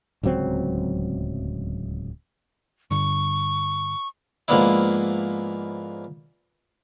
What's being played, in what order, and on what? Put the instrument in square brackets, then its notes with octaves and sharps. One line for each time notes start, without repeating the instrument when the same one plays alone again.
[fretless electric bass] D1 C#2 F#3 C4
[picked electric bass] G2 D3 [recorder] C#6
[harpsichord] G#2 F3 A#3 B3 D4 E4